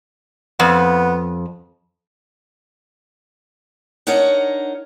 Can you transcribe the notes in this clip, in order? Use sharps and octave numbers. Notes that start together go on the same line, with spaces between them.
F2 B3
D4 D#4 A#4 C#5 F#5